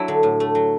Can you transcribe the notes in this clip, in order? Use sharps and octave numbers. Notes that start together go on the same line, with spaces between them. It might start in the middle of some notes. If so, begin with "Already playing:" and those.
Already playing: F#3 D4 E4 F#4
D3
A2
A3
F#3